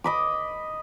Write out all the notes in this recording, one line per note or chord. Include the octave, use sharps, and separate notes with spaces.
D#5 B5 D6